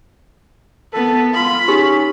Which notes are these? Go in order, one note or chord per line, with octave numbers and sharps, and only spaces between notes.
B3 A4 B4
F4 B5 D#6
C#4 D#4 G4 A#4